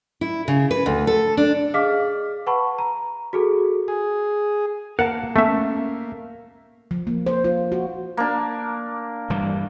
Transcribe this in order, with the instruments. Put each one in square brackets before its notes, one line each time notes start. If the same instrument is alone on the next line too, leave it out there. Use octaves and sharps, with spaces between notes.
[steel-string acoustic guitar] E4
C#3
B4
D2
A4
D4
[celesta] G#4 D#5 F5 D6 F6 B6
B4 F#5 A5 B5 C#6
A#5
F#4 G#4 A4
[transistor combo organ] G#4
[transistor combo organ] A#3 [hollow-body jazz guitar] A#4 F5 A5 [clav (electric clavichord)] F#5
[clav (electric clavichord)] A3 E5 [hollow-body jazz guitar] B3 C#4 A4
[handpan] F3
A#3
C5
F4
F#4
[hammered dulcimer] A#3 D4
[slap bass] G2 E3 G3